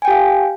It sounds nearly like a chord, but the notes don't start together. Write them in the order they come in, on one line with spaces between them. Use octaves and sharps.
G#5 G5 G4 F5